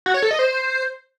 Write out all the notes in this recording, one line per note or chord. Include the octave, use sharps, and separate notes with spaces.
F#4
C#5
A4
D#5
C5